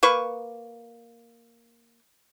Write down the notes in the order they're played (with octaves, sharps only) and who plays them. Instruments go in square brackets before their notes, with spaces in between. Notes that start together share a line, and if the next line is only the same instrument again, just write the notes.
[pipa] A#3 B4 C#6